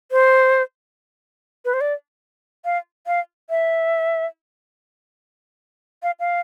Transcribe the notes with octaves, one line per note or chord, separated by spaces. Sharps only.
C5
B4
C5
D5
F5
F5
E5
F5
F5